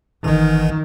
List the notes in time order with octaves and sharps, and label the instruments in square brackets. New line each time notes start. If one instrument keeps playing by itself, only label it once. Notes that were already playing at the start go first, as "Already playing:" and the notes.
[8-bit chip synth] G1 E3 [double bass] D#3